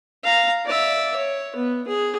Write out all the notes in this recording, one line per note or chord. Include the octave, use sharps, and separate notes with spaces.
F5 A#5
D5 E5
C#5
B3
G#4